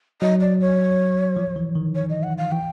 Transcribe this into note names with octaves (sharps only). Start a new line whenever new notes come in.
F#3 D#5
D5
C#5
F3
E3
D#3
C#5
D#5
F#5
F5
E3 G5